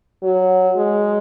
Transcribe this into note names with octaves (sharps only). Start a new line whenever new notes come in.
F#3
G#3